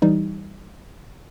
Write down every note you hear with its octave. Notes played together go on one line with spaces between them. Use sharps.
E3 G3 D#4